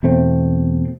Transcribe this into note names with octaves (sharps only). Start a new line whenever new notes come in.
E2 B2 A3 C4